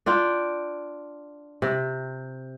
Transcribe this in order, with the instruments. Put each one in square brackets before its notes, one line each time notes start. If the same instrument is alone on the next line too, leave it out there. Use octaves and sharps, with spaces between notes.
[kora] D4 F4 G5
C3